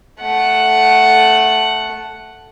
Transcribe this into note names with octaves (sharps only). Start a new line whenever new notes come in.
A3 F#5